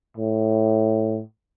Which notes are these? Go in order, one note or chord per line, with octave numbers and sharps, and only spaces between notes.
A2